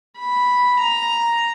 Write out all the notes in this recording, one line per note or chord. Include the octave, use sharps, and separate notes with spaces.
B5
A#5